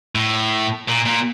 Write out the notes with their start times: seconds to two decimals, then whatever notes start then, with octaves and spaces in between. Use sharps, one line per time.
0.15 A2
0.88 A#2
1.06 A#2